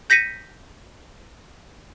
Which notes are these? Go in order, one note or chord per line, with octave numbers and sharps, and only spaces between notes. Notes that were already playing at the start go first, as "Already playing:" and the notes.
G6 A#6 B6 C#7 D#7